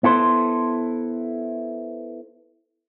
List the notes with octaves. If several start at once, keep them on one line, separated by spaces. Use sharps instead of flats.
B3 E4 A4 C5